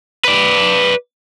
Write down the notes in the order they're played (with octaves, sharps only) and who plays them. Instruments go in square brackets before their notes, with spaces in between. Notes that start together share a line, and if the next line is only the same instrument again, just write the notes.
[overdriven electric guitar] B4 D5